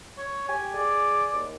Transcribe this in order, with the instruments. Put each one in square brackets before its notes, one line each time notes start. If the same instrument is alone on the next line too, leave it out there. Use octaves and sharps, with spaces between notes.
[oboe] C#5
[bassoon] G4 [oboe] G#5
[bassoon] G#4 [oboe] D5
[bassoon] D#2